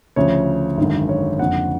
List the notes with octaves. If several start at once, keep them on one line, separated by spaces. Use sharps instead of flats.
D2 C#3 F3 C#5
G#1 F#2 D3
C#5
F#1 F2 D3 F#5